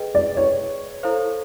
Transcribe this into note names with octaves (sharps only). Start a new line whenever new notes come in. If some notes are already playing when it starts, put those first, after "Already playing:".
Already playing: G#4 B4 D#5 G5
D5
C#5
E4 A4 C5 F5